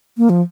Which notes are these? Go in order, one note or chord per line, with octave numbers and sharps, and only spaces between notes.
A#3
F3